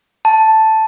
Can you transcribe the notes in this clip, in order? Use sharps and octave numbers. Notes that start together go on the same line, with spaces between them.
A5